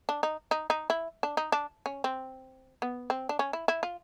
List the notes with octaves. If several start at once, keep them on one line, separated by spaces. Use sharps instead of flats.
D4
D#4
D#4
D#4
E4
D4
D#4
D4
C#4
C4
B3
C4
D4
C#4
E4
E4
F4